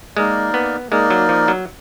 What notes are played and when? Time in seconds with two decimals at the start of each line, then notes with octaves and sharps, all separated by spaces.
0.16 G#3 A#3 D#4 A#4 D5
0.54 B3
0.91 G#3 A#3 D#4 A#4 D5
1.10 F#3
1.29 F3
1.48 F#3